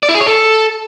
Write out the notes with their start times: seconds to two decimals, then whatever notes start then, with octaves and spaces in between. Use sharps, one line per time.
0.03 D5
0.09 E4
0.15 G#4
0.21 C#5
0.26 A4